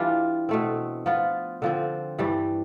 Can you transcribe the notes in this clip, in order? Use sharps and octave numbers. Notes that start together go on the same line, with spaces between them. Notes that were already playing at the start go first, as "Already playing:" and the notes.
Already playing: E3 G3 D4 F4
B2 A3 C4
F3 B3 F4
D3 F3 C4
G2 E3 G3